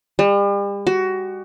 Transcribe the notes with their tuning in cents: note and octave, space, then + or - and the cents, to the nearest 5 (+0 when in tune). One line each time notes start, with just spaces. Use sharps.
G3 +40
F#4 +20